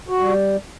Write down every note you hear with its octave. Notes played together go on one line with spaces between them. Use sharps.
F#4
G3